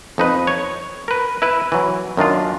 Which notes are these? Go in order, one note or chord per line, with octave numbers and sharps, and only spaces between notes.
F2 D#4 B4
C#5
A#4 B4
E4 B4
E3 F#3
F#2 D#3 D4 F4